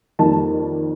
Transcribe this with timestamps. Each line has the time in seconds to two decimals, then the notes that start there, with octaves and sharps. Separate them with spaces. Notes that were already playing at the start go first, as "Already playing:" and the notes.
0.19 F2 D#3 G3 A#3 A5